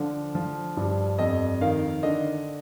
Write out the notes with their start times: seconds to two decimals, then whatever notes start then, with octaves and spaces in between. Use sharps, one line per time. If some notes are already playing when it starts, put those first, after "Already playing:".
Already playing: D3 F3
0.35 F3
0.77 G2
1.19 F2 D#5
1.61 D#3 F5
2.03 D3 D#5